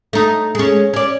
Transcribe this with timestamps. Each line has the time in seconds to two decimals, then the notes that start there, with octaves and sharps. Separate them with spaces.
0.13 A3 D#4
0.55 G#3 C#4
0.94 C#4 D5